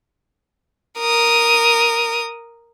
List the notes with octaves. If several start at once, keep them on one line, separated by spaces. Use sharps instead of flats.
A#4 D#6